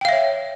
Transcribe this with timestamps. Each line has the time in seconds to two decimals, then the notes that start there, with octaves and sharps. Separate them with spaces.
0.01 G5
0.05 F5
0.09 E5
0.12 C#5